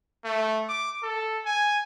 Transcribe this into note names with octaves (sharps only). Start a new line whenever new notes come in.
A3
D6
A4
G#5